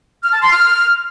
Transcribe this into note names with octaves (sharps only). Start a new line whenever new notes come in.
F6
A5
C6
F6